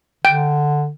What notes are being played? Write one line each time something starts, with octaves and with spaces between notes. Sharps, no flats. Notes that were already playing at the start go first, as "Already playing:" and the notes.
D3 G5